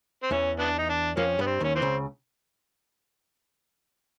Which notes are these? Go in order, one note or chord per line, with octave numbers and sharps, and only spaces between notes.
C4
E2 E3 C#4
B3 D4
D#4
D4
F2 F3 A#3 C#4
G2 G3 B3
C4
D#2 D#3 C#4
E3 C4
C#2 C#3